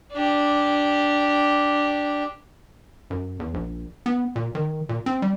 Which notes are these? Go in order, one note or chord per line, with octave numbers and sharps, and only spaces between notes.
D4 G4
F#2
E2
A#1
B3
A#2
D#3
A#2
C4
G3